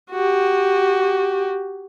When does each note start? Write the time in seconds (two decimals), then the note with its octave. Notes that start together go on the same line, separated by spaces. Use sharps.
0.11 F#4 G4